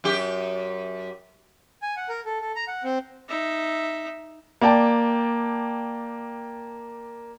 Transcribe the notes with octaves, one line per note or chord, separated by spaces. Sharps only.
F#2 G4
G#5
F#5
A#4
A4
A4
A#5
F#5
C4
D#4 E5
A#3 D5 G5 A5